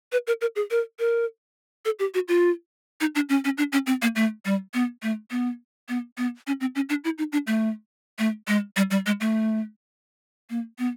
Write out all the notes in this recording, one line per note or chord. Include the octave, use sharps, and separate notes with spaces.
B4
A#4
A#4
G#4
A#4
A#4
A4
G4
F#4
F4
D#4
D4
C#4
C#4
D4
C#4
C4
A#3
A3
G3
B3
A3
B3
B3
B3
C#4
C4
C#4
D4
E4
D#4
D4
A3
A3
G#3
G3
G3
G#3
A3
A#3
B3